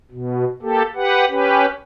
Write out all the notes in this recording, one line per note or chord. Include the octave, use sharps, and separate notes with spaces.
B2
A#3 G4 A4
G4 B4 F#5
C#4 G4 B4